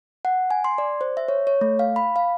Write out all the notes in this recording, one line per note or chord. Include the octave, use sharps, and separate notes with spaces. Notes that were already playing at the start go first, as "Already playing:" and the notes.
F#5
G#5
C6
D5
C5
E5
C#5
C#5
A3
F5
B5
F5